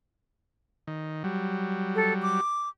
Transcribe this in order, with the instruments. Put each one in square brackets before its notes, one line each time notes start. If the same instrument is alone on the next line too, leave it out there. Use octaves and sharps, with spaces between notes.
[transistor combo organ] D#3
F#3 G3
[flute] A4
D6